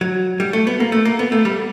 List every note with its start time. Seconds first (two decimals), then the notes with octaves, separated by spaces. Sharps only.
0.01 F#3
0.40 G3
0.53 A3
0.67 B3
0.80 A#3
0.92 A3
1.05 A#3
1.19 B3
1.32 A3
1.45 G3